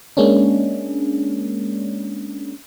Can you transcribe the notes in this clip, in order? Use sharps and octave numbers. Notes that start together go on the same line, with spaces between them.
G#3 A#3 C#4 D4